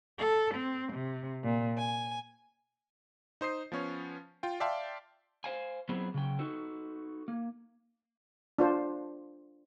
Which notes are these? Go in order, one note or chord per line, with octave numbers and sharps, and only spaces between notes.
A4
C4
C3
A#2
G#5
D#4 C5 D#6 C7
F3 B3 C#4 C#5
F4 G5
D5 E5 F5 G5 A5 C6
C5 F5 G#5
F#3 B3 C4 E4 G#4
C#3 F#3 G5
D#4 F#4 A4
A#3
D4 F4 C5